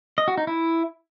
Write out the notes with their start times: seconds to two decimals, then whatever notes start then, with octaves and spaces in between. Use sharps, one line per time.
0.18 D#5
0.28 F#4
0.38 D#4
0.47 E4